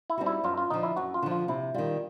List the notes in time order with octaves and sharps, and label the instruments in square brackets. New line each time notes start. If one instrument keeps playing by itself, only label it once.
[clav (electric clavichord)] E4
[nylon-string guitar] G3 C4 D#4 F#4
[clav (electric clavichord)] E4
[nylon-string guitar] F#2 [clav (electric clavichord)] F4
[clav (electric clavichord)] F4
[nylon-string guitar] D3 F3 [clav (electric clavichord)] D#4
[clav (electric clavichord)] E4
[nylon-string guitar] F#2 [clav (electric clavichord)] F#4
[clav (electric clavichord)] F4
[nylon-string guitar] D3 F3
[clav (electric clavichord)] F4
[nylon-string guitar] C3 [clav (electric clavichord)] E4
[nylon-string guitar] D#3 G3 [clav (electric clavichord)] F4